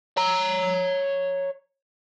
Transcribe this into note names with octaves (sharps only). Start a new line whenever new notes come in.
C#5 A#5